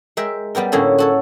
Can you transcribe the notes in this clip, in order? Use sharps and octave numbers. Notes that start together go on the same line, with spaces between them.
G#3 A#4 E5 G5
G3 B3 G4 A#4
A2 D3 A#3 C#4 G#4 A4
F#4 A4 C#5